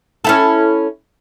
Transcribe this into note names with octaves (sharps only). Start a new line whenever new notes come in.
C#4 E4 A4